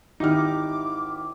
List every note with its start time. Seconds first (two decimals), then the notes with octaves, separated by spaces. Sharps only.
0.20 G#1 D#4 E4 G4 D6 F6